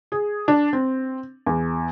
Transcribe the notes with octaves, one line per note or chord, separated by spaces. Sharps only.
G#4
D4
C4
E2